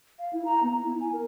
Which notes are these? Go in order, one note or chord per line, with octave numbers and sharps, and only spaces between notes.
F5
E4
A#5
B3
E4
G#5
A#4